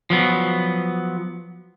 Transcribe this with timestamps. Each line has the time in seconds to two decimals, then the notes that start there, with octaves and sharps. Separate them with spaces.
0.10 F3 F#3 B3